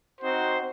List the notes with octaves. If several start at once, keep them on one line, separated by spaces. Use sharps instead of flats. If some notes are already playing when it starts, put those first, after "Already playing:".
C4 D#4 F#4 C5